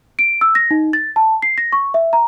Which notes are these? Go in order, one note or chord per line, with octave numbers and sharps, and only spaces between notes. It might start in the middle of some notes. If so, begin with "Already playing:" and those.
D7
E6
A#6
D#4
A6
A5
C7
A#6
C#6
E5
A#5